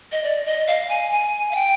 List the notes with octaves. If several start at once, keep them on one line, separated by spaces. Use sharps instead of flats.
D#5
D5
D#5
F5
G#5
G#5
F5
G5